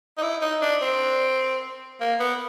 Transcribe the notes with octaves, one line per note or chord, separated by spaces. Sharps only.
D#4
E4
D#4
D4
C4
A#3
B3